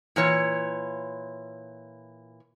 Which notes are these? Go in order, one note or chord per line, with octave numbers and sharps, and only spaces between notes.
A#2 E3 C#5